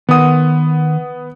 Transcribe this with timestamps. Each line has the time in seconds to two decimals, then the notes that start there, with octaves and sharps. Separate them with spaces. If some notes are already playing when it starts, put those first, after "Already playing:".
0.09 D#3 B3 F#5 D#6